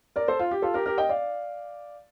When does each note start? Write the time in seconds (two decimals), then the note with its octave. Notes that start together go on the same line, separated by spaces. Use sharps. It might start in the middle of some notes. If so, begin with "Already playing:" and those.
0.16 A#4 D5
0.28 A4 C5
0.39 F4
0.51 G4
0.62 F4 A4
0.74 G4 A#4
0.86 G4 A#4
0.98 D#5 G5
1.09 D5 F5